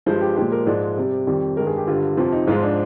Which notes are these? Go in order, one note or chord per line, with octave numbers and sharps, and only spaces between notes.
G2 F3 G#3 C5
G4
A#2 F3 G#3 G4
A#4
G#2 F3 G#3 D5
C3 G3
F2 D#3 G3
G2 D#3 G#3 A#4
G#4
G4
G2 D3 G3 F4
F2 C3 F3 F4
D#4
G#2 F3 G#3 F4
D4